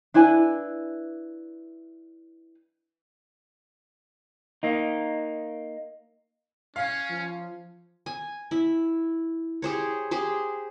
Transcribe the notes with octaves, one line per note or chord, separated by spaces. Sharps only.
D4 E4 B4 G#5
A#3 D#4
C#4 F5
F3
G#5
E4
G4 G#4 C5 C#5
G4 G#4 C5